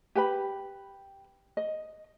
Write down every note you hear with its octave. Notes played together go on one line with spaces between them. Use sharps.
G4 B4 G5 B5
D#5